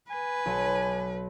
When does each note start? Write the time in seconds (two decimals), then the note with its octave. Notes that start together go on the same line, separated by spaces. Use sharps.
0.10 B4 G#5
0.46 B1